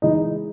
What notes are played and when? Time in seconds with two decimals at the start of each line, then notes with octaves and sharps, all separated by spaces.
0.02 E3 G#3 D#4